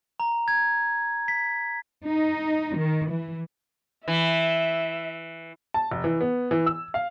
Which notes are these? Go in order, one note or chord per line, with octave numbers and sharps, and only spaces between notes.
A#5
G#6
B6
D#4
D#3
E3
E3 E5
A5
F1
E3
B3
E3
E6
F5